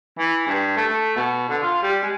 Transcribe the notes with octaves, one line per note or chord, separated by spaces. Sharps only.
E3
G2
A3
A3
B2
D3
F4
G3
G#3